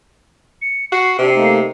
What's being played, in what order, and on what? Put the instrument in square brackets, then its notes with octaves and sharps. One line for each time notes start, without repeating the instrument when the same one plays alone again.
[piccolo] C#7
[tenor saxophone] F#4 [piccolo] C7
[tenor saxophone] C3 [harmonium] D4
[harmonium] A3 A#3 D#4